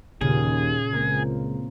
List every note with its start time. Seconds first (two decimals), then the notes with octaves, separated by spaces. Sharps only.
0.21 D#2 A#2 C#3 F4 G#4
0.93 C#2 A#3 C4 A#4